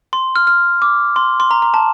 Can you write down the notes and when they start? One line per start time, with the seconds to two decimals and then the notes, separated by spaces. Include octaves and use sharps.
0.13 C6
0.36 F6
0.47 F6
0.82 D6
1.16 C6
1.40 C6
1.51 A#5
1.62 A#5
1.74 A5